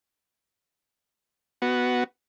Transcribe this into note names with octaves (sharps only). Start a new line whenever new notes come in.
B3 F#4